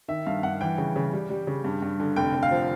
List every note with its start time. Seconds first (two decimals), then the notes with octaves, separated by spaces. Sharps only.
0.08 D#3 E5
0.26 G2 F5
0.43 G2 F#5
0.61 E3 G5
0.78 C#3
0.96 C#3
1.13 G3
1.30 G3
1.47 C#3
1.65 G2
1.82 G2
2.00 D3
2.16 F1 G5
2.34 F1
2.43 F5
2.51 F3